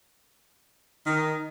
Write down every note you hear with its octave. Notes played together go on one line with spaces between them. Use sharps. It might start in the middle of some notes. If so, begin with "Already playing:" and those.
D#3